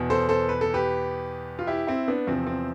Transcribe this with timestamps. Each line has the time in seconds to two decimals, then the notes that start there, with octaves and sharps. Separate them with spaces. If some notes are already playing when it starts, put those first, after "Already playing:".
Already playing: E2 B2
0.10 A4 C5
0.29 A4 C5
0.49 B4
0.61 A4
0.74 G4 B4
1.59 F4
1.67 E4 G4
1.87 C4 E4
2.08 B3 D4
2.27 E2 C3 F3 C4
2.47 C4